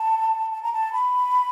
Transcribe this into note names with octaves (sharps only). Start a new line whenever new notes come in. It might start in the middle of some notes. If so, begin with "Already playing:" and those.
Already playing: A5
A5
A#5
A5
B5